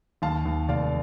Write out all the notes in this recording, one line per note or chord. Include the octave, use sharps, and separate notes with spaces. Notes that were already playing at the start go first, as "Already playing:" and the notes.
D#2 F5 A5
D#2
F1 D5 F5